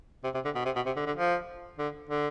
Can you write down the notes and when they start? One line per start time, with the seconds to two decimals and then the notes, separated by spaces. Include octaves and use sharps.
0.24 C3
0.34 C3
0.45 D3
0.55 B2
0.65 C3
0.76 B2
0.86 C3
0.96 D3
1.06 D3
1.17 F3
1.78 D3
2.09 D3